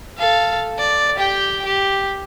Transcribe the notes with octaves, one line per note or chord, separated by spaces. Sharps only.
A4 F5
D5
G4 G5
G4